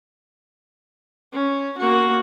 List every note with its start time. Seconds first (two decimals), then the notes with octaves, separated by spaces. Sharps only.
1.33 C#4
1.78 A#3 F#4